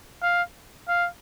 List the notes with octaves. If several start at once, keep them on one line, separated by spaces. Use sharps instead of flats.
F5
F5